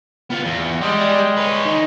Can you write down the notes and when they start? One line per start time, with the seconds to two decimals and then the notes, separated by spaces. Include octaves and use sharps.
0.30 B3 F4
0.44 E2
0.81 G3 G#3 D5
1.37 B4 C#5
1.66 D#3 D#4